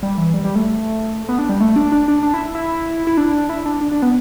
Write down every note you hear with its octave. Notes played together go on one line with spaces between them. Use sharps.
G3
E3
G3
G3
A3
B3
D4
G3
A3
D4
D4
D4
D4
E4
E4
E4
D4
E4
D4
D4
D4
B3